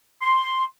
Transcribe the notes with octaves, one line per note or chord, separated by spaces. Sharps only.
C6